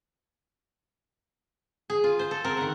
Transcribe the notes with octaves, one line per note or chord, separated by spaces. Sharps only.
G#4
F4
C5
A4
C4 A#4
D#3 F#5